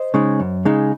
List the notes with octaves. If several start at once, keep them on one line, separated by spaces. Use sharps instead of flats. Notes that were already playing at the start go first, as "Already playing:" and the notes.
Already playing: C5 D#5
C#3 G#3 D#4
F#2
C#3 G#3 D#4